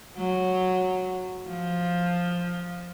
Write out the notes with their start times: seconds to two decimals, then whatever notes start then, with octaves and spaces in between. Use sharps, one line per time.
0.17 F#3
1.47 F3